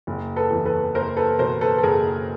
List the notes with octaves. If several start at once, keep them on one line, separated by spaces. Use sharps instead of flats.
F#1
A4 B4
E2
A4 B4
F#1 A#4 C5
A4 B4
B2 A#4 C5
A4 B4
A4
F#1 G#4 A#4